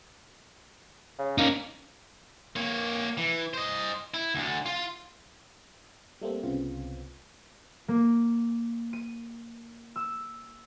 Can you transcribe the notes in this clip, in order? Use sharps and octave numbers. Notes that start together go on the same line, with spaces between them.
C#3
A#3 C#4 D#4
A#3 C#5
E3
C5 D#5
E4
D2 D3
F4
G3 A3 A#3 C4
C2 C#3 B3 C4 F4
A#3
D#7
E6